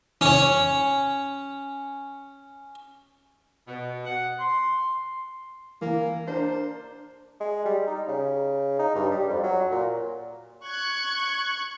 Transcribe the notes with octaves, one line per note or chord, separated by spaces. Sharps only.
C#4 C#5
B2
F#5
C6
E3 A#3
D4 A#4 C5
G#3
G3
D#4
C#3
D#4
G2
G3
F2
F#3
A#2
C#6 F#6 G#6